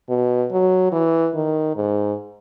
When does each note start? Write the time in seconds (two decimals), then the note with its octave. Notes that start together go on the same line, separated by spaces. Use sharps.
0.09 B2
0.51 F#3
0.92 E3
1.35 D#3
1.76 G#2